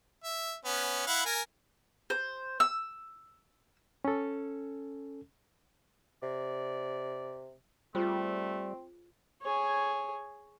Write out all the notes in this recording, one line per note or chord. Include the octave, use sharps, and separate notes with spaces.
E5
B3 C#4
E4 F5 F#5
A#4 G#5
C5
E6
C#4 A4
C3 D5
G3 A3 C4 F4 G#4 C5
G#4 C#5